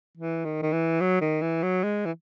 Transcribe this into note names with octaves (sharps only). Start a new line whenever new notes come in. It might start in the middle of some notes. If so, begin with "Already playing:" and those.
E3
D#3
D#3
E3
F#3
D#3
E3
F#3
G#3
E3